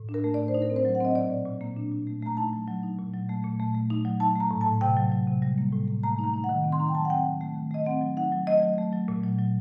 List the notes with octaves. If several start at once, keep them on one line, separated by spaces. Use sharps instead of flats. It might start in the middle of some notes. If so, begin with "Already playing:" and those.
Already playing: A2
D4
A#4
A3
A2 D5
C5
D#4
A#4
C4
C5
F#3
F#5
C4 D#5
A#2 D5
A#2
A#2
A#3
D4
A#2
A3
A3 A#5
D#4 A5
F#3
F#3
D#4
A#2
F#3
A3
A#2
A3
A3
D#4
F#3
D#4 A5
A3 A#5
A2
A5
A2
C3 G5
F#3
F#3
C3
G3
A#3
A2
A#3
A3 A#5
D#4
A#5
D#4
F#5
D#3
C4
C6
D#4 A#5
G5
F#3 A5
F#5
C4 G5
D#3
A3
D#3
A3 D#5
C4 F#5
F#3
D#4 F#5
F#3
A3 D#5
F#3
A3
F#3
A#2
F#3
F#3